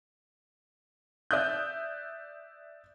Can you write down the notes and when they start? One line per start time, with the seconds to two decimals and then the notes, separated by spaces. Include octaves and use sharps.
1.31 D5 E5 D#6 F#6 G6